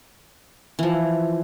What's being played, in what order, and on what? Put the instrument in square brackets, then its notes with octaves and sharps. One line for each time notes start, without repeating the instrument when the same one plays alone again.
[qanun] E3 F3